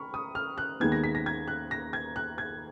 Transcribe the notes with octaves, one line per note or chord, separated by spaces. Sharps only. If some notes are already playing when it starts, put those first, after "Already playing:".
Already playing: B5 C#6 F6
D#6
F6
F#6
D#2 D#3 G#3 B3 G#6
A#6
B6
A#6
G#6
F#6
A#6
G#6
F#6
G#6